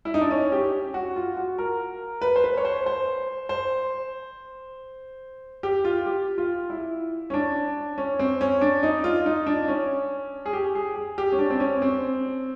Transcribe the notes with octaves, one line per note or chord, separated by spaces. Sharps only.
E4
D#4
D4
C#4
G4
F#4
F4
F#4
A#4
B4
C5
B4
C#5
C5
C5
C5
G4
F4
G4
F4
E4
C#4
D4
C#4
C4
C#4
D4
D#4
F4
D#4
D4
C#4
G#4
G4
G#4
G#4
G4
C#4
D4
C4
C#4
C4